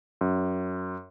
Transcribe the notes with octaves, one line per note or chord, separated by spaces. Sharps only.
F#2